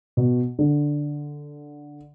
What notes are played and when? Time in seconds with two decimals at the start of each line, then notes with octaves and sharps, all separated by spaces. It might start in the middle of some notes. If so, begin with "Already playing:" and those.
0.17 B2
0.59 D3